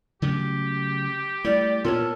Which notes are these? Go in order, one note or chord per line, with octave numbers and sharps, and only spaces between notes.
C#3 F#3 A3 G4
G3 A3 E4 D5
A#2 B3 F4 A4 A#4 C#5